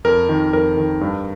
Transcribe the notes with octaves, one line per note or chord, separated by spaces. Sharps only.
F2 A#4
D#3
F2 A#4
D#3
G2